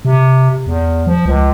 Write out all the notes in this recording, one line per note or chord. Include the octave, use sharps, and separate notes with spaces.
C3
E2
F3
C#2